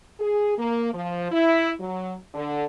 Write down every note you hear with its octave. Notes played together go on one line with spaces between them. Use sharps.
G#4
A#3
F3
E4
F#3
D3